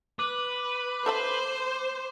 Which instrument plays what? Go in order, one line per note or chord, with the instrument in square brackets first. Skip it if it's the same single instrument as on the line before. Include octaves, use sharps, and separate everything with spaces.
[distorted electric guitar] B4 [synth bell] D6
[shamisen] A4 E5 A5 [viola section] C5